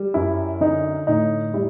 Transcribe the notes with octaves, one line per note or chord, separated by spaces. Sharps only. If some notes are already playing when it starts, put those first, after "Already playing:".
Already playing: G3
F#2 E4
D3 D#4
A2 D#4
G3 E4